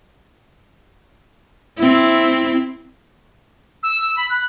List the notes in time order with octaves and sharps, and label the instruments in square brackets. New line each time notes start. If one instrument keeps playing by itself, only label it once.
[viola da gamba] C4 E4
[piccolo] E6
B5
F#6